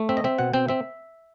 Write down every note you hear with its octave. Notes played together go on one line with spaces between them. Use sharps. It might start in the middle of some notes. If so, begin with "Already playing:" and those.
Already playing: A3
C4 E5
D#5
C4 E5
B2 F#5
C4 G5
C4 E5